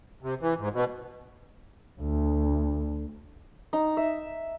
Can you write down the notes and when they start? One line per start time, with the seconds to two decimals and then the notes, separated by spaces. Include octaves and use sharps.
0.22 C3
0.41 E3
0.58 G#2
0.73 B2
2.00 D2
3.73 D#4
3.97 E5